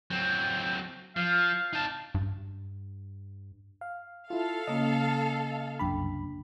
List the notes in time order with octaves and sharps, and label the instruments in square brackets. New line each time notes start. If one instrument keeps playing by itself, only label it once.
[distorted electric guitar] F#3 C4
[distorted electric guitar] F3 [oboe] F5
[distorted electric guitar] D#4 A5
[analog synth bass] G2
[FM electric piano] F5
[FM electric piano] E4 F4 [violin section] A4 F5
[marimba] C#3 A#3 C#4 [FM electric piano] D#5
[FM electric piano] C2 F#2 B5 [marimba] D4 G5